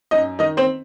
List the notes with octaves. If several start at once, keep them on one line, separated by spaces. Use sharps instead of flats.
F#2 D#4 D#5
D#3 D#4 D#5
C4 C5